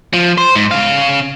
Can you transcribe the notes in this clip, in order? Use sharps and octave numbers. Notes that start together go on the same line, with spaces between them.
F3
C5
G#2
C#3 F5